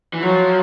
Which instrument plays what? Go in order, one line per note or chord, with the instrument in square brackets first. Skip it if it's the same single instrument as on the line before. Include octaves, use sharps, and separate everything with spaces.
[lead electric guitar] E3
[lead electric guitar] F3 [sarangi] F#3